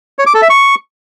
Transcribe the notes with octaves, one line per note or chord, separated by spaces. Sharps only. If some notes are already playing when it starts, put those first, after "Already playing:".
C#5
D6
A4
E5
C#6